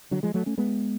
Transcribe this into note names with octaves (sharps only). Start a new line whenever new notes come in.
D3 F#3
F3 G#3
F#3 A3
A3 C#4
G#3 B3